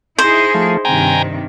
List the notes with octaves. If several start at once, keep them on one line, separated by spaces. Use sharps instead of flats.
D#4 E4 G#4 C5
F3 A3
G2 C3 D#3 G5 G#5 A#5